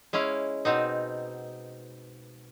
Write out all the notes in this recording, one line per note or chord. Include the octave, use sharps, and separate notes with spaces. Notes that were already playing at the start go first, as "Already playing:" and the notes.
G#3 C#4 E4 F5
B2 C4 D#4